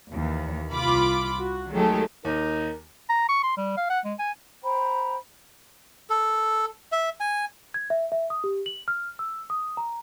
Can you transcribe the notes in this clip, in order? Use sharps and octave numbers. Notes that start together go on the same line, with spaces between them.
D#2 E3
C2 F4 B5 D6
F#4
D#3 F#3 G#3 A3 G4 A4
D#2 D#4 A#4
A#5
C#6
C6
G3
F5
F#5
G#3
G#5
C5 G5 A#5 B5
A4
E5
G#5
G#6
E5
E5
D#6
G4
F#7
F6
E6
D#6
A#5